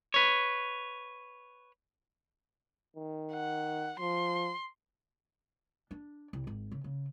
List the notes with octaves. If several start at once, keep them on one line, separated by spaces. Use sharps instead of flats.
B4 C#5
D#3
F#5
F3 C6
D4
C2
G#1
C#3
C#3